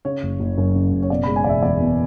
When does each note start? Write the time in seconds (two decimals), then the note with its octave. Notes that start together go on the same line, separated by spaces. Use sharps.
0.05 C#3 C#5
0.23 F#1
0.40 F#1
0.58 F#2
0.75 C#3
0.92 F#1
1.02 C#5
1.10 B2 D5
1.23 G#3 B5
1.36 G#5
1.44 E1 D5 E5
1.62 E2 D5
1.80 B2